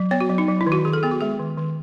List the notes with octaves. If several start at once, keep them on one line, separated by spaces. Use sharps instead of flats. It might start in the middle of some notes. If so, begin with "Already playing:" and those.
Already playing: F#3
B3 C#5
F#4
F#3
D#4
F#3
E4
D#3
F#4
D#3 G#4
A4
B3 G#4
F#4
G#3 G#4
D#3
D#3